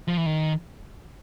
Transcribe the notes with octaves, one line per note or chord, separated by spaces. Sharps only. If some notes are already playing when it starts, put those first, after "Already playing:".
F3
E3
D#3